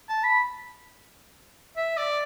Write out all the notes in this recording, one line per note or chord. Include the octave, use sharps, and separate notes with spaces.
A5
B5
E5
D5